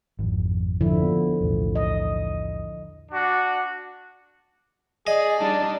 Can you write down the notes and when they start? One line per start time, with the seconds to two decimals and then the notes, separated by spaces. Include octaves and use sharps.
0.19 G#1 F2
0.81 D3 F3 E4
1.03 B3
1.41 B1 E2 A2
1.75 D#5
3.11 D4 F#4
5.07 G#4 D5 D#5
5.39 G3 D4 D#4 A5